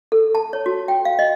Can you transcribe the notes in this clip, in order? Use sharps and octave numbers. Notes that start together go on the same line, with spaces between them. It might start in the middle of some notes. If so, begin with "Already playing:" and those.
A4
A5
C#5
F#4
G5
F5
D#5